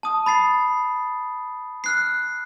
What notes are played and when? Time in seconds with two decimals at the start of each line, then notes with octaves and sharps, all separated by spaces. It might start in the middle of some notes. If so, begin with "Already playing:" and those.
0.03 A5 D#6
0.26 B5 A6 C7
1.84 F6 F#6 C7